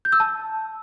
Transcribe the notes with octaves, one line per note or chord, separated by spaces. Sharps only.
G6
E6
A5